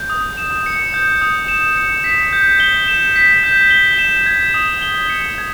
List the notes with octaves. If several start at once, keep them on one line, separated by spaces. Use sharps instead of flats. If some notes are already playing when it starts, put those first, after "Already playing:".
Already playing: G6
D#6
E7
C#7
G6
D#6
E7
C#7
B6
G6
G7
E7
B6
G6
G7
E7
G#6
D#6
G7
C#7
G#6